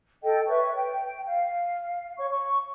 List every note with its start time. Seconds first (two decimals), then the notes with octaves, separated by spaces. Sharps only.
0.23 A4 D#5 G5
0.48 B4 C#5 E5 C#6
0.74 G5
1.27 F5
2.18 C#5 C#6
2.30 C#6